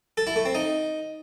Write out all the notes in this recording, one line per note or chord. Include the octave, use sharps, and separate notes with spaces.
A4
E4
A3
C4
D#4